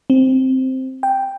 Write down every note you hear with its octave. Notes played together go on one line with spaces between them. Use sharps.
C4
G5